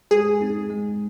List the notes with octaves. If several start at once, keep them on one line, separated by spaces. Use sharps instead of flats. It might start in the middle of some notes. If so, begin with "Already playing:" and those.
G#3 G#4
C4 D#4
G#3